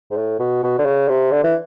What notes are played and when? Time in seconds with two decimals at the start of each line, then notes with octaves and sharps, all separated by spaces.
0.11 G#2
0.17 A2
0.39 B2
0.63 B2
0.79 D3
0.85 C#3
1.08 C3
1.31 D3
1.43 E3